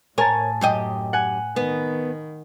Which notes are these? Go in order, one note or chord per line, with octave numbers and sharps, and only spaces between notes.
A2 A#4 C#5 G#5 A5
F#2 G4 D#5
F#5 G#5
D#3 B3